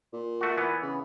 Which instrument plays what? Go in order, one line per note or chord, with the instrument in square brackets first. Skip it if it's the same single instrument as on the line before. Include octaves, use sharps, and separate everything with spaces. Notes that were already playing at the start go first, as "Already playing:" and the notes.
[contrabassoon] A#2
[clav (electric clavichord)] A3 F#4
E3 B3
[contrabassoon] C#3